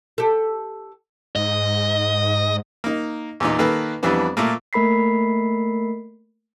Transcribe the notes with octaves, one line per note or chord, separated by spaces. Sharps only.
G4 A4
G#2 D#5
A#3 D#4
E2 A#2 D#4
D#3 A#3 A4 B4
F2 E3 G3 B3 D4
A#2 A3 A#3
A3 A#3 A#4 B5 B6 C7